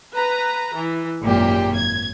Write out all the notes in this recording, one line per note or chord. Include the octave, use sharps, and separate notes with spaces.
B4 A#5
E3
G#1 F#2 A#2 G4
G#6